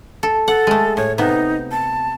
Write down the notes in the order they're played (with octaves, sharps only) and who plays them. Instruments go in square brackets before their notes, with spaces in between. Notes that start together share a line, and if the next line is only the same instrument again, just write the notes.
[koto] A4
[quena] A4 [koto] F#5
[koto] G#3 A3
[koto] A2 [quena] C#5
[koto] C3 B3 [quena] D#4
[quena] A5